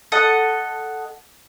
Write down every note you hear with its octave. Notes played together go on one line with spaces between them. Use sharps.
A4 D#5 F#5